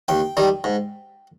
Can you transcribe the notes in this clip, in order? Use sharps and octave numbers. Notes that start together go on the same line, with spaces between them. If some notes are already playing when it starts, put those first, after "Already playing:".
D#2 G5
D#3 G3
G#2